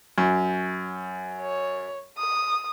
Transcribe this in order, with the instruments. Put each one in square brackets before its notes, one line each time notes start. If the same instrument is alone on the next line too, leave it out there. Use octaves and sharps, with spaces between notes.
[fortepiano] F#2
[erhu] C#5
D#6